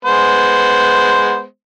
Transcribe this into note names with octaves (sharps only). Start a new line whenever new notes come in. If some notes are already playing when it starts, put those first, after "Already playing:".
G#3 B3 C5